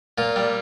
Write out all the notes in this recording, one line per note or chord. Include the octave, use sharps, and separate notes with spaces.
A#2 F4
G3